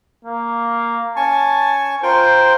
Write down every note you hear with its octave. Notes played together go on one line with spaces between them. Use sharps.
A#3
C#4 G#5 A5 C#6
F4 A#4 C5 G5